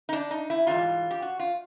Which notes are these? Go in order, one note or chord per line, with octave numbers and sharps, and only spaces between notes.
D#4
D4
D#4
E4
G#2 E3 G3 F4
G4
F#4
F4